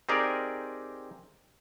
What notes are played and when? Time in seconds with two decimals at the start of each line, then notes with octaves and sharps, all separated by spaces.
0.09 C4 D#4 G4 G#4 A#4 D5